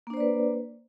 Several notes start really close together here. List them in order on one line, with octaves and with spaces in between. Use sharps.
A#3 D4 C5 D5 B4